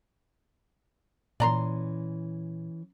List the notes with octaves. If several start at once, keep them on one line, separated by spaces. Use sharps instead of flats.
A#2 E3 C#4 D5 A#5 C6